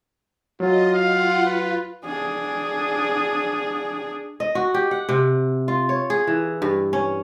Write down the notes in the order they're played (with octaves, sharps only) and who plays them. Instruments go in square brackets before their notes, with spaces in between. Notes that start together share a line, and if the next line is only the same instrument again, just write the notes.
[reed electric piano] F#3 F#4 [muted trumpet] F4 [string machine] D#5
[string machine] F4 F#5 [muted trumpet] F5
[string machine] F4 [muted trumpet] B4
[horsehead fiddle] D4 G#4
[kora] D#5
F#4
G4
F#5
C3
F4
C#5
G#4
E3
G2
C#4